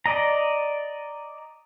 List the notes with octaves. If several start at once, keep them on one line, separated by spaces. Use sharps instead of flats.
D5 D#5 A#5